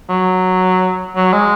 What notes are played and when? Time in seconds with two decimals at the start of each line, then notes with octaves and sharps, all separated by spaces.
0.09 F#3
1.16 F#3
1.33 G#3